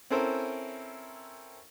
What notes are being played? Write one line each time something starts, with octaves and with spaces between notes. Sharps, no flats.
C4 C#4 E4 A4 A#4 C5